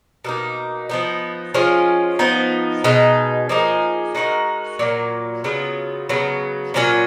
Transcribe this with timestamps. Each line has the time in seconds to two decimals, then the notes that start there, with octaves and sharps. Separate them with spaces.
0.24 B2 A#3 D#4
0.89 F3 B3 D#4
1.54 F3 G#3 C#4 F4
2.19 F3 B3 D#4
2.84 B2 G#3 D#4
3.49 F3 A#3 D#4 G#4
4.15 G#3 D#4 F#4 A#4
4.79 A#2 F#3 A#3
5.44 C#3 F#3 B3 F4
6.09 C#3 F#3 B3
6.74 A#2 F#3 C#4 F4